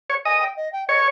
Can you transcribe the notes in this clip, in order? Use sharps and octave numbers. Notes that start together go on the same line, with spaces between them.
C#5
D#5 G#5
G5
D#5
G5
C#5 D#5